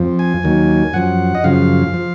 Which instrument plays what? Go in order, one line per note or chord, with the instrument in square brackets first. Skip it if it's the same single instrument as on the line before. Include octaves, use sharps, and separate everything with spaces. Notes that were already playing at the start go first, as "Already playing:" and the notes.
Already playing: [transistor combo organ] F2 F3
G#5
D#2 D#3 F#3
F#2 F3 F#5
D#5
F#2 C#3 F3 F5
F3